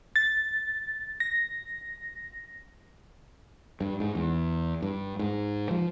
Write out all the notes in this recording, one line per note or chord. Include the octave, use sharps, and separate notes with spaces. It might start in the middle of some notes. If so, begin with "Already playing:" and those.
A6
A#6
G2
G#2
E2
G2
G#2
F3